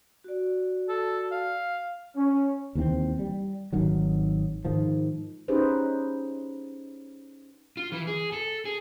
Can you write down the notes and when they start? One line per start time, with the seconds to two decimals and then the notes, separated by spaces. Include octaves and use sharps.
0.24 F#4 D5
0.89 A4
1.31 F5
2.16 C#4
2.75 D#2 E3 F3 C4
3.19 G3
3.73 G#1 D#3 F#3
4.65 G#2 D#3 F3
5.48 C#4 D#4 G4 G#4 B4 C5
7.77 F4
7.92 E3
8.07 G#4
8.33 A4
8.65 G#4